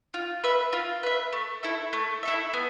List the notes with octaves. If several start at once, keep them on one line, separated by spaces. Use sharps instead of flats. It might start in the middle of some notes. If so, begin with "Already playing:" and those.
F4
B4 E5
F4
B4 E5
A3
E4 A4 E5
A3
E4 A4 E5
B3